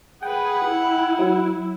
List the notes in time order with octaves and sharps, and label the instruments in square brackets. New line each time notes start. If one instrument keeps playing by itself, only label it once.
[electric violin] G#4 B4 [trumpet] F#5 [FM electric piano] G5
[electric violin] E4
[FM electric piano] F#3